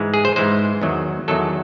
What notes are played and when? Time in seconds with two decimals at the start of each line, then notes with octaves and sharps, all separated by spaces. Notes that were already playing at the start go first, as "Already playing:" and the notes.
Already playing: G#2 E3 G#3
0.14 G#4
0.25 C5
0.36 G#2 E3 G#3 C5
0.82 E2 D#3 F#3
1.28 E2 D#3 F#3 A4